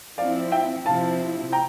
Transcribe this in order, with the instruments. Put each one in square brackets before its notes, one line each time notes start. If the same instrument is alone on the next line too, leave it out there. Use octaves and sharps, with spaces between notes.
[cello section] F3 C4 E4 [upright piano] D5 F5
[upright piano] E5 G5
[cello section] C3 F3 C4 E4 [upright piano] F5 A5
[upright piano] G5 A#5